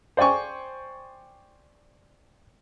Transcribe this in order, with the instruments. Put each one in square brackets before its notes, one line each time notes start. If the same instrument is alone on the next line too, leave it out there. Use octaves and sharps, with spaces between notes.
[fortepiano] C5 D5 G5 G#5 C#6